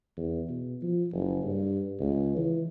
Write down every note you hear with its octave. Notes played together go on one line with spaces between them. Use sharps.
E2
B2
F3
F#1
G2
C#2
E3